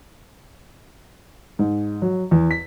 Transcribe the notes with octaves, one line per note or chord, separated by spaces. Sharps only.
G#2
F#3
E2
B6